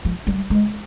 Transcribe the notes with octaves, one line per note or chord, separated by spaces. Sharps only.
F3
G3
G#3